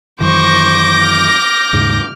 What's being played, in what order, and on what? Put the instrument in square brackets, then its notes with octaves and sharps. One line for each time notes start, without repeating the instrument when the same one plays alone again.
[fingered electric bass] F#2 D#3 E3 [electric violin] C5 C#6 [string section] D6 G6 A#6
[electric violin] F6
[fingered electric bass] D#2 G#2 C#3